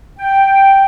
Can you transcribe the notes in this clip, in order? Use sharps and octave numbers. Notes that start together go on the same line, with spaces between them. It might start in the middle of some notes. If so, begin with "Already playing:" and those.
G5